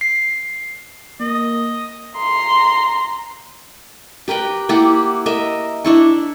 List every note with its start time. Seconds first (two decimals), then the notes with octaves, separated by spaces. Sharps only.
0.01 C7
1.21 A#3 D#5
2.17 A#5 C6
4.28 G4 A#4 B4 G5
4.69 A#3 E4 G4 F#5
5.26 A#4 D#5 E5
5.84 D4 E4 C#6